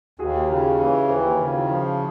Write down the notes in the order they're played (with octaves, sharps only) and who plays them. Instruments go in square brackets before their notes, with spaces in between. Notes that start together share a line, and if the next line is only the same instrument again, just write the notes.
[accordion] D#2 [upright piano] F#4 G#4
[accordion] C#3 [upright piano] F4 G4
[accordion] E3 [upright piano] B4 C#5
[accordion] D#2 [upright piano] A#4 C5
[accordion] C#3
[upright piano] F4
E4 F#4
[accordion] F3